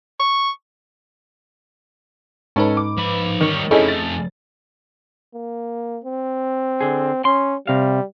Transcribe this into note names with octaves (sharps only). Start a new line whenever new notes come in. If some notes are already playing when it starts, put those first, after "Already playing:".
C#6
G#2 C#4 D#4 A4 B4
D6
F3 B5
D#3 G3 C#5
F2 A3 C#4 D#4 E4 G#4 A4
A6
A#3
C4
D3 G#4
C#4 C6
C3 G3 F5